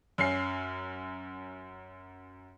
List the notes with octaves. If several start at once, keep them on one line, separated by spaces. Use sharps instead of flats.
F#2 C#4 C7